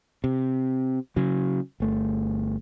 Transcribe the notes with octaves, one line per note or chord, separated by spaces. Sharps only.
C3
C#3 F#3
G1 A3